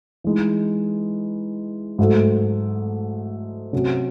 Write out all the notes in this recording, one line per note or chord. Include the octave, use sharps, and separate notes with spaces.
E3 G#3 D#4
G#2 F#3 A3
C3 F#3 C#4